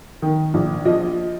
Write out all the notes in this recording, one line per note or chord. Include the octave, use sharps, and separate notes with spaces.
D#3
A#1
F3 D#5